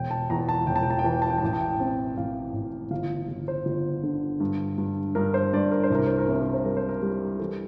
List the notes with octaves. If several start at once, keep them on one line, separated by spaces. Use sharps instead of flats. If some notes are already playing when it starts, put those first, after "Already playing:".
Already playing: E1 G5
A5
E2 A#5
A5
E1 G5
A5
G5
A5
G5
E3 A5
G5
A5
G5
A5
A1 G5
A5
G5
C4
A1 F5
A1
G1 F5
G1
C5
G1
D3
G2
G2
G2 A#4
C5
G2 D5
A#4
C5
C2 A#4
C5
A#4
C3 C5
A#4
C5
G3 A#4
C5
A#4
G3
E3 A4